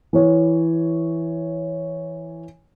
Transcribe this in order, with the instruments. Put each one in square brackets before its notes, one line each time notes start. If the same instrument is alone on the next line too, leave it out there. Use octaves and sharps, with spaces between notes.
[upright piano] E3 C#5